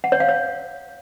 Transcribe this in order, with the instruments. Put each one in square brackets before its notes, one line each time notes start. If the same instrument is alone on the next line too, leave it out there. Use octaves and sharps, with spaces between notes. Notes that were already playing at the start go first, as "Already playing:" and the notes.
[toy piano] F#5
C#5
F5
C#5